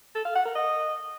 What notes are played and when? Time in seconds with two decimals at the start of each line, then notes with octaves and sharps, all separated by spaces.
0.15 A4
0.25 F5
0.35 F#5
0.45 A#4
0.55 D#5